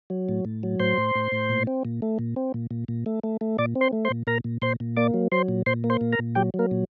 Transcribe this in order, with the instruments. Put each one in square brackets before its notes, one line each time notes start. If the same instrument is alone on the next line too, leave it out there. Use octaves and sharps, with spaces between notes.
[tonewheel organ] F#3
A2
A2
F#3
A2 C5 C6
A2
A2
A2
A#2
C4
A#2
A3
A#2
C4
A#2
A#2
A#2
A3
A3
A3
A#2 D5 D6
C4
C5 C6
A3
C5 C6
A#2
A#2 A#4 A#5
A#2
A#2 C5 C6
A#2
A#3 D5 D6
F#3
F#3 C5 C6
A#2
A#2 C5 C6
A#3
C5 C6
A#2
A#4 A#5
A#2
F#3 G4 G5
F#3
A#3 A#4
A#2